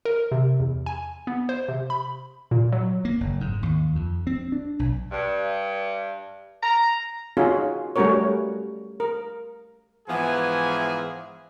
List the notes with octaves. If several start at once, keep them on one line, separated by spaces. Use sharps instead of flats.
A#4
C3
E2
G#5
B3
C5
C3
B5
A#2
F#3
A#3
F#1
G#2
D#2
F2
C4
D4
B1
G2
A#5
C#4 D#4 F4 F#4 G#4
G3 A3 C#4 F#4 A#4 C#5
A#4
G#2 E3 F3 B3 G#4 G#5